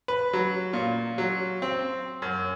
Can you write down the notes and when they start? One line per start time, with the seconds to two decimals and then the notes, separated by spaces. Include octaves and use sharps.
0.08 B4
0.33 F#3
0.73 A#2
1.18 F#3
1.62 C4
2.22 F#2